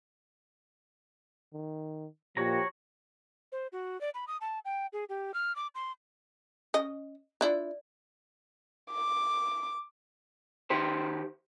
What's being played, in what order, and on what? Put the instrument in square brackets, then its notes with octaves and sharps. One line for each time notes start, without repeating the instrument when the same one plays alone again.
[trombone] D#3
[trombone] A#2 [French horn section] F3 A#3 G4 [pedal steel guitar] F#4 C#5 A#5
[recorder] C5
F#4
D5
B5
D#6
A5
G5
G#4
G4
F6
D6
C6
[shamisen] C#4 D#5
[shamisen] D4 E4 F4 [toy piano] D5
[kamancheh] D6
[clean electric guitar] D#3 G4 C5